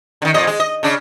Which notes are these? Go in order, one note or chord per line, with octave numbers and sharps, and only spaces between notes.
D3 D#3
F2 A#2 D#5
G#3
D#5
C#3 D4